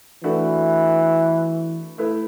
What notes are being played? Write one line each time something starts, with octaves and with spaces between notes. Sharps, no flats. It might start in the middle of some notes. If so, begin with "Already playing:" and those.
E3 A3 D4 F#4 B4
A3 E4 B4